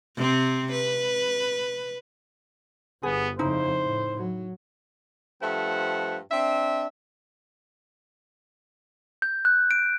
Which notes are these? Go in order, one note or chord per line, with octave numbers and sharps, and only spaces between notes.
C3 C4
B4
G1 B3 G#4
F2 C#3 D#4 E4 C5
A2
F#3
G2 F3 A3 C5 F#5
C4 D4 E5
G6
F#6
D7